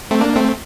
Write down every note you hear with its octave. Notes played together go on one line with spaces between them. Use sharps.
A3 C4
A#3 D4
A3 C4